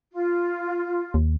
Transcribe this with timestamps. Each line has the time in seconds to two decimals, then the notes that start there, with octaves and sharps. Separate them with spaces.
0.13 F4
1.14 D#2